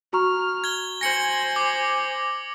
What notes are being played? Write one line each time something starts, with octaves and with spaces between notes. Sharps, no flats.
F#4 A#5 C#6 F6
G#6 G7
C5 G#5 A#6 C#7 F#7
D6